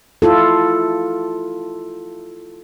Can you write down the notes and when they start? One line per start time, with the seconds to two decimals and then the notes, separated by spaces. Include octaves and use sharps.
0.22 E4 F4 A4